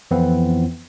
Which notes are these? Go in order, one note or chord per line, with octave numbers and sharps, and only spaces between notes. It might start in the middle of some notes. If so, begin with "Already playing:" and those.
F2 E3 B3 C4 E4